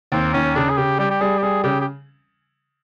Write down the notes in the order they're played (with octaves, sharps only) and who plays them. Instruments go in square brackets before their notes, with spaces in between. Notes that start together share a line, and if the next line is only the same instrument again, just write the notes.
[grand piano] D#2 [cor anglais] C4
[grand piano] D#2 [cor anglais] C#4
[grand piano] C#3 [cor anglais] D4
[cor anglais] G#4
[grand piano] C#3 [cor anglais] G4
[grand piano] G3 [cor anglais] G4
[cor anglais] G4
[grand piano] G3 [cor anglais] G#4
[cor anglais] G4
[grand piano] G3 [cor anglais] G#4
[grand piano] C#3 [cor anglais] G4
[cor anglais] G4